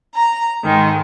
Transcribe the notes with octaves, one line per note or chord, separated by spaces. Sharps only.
A#5
G#2 D#3 G#3